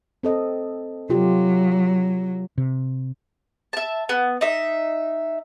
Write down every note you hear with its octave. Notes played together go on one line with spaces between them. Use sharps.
C4 A4 D#5
C3 F#3 F4 G4
C3
E5 A5
B3
D#4 E5